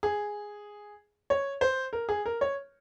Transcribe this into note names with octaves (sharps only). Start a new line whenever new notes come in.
G#4
C#5
C5
A#4
G#4
A#4
C#5